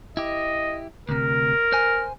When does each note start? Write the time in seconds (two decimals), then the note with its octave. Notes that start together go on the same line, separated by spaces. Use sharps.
0.17 E4 G4 D#5
1.09 D2 C3 A#4
1.73 C5 G#5